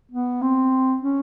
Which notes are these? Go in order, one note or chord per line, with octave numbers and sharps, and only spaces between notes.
B3
C4
C#4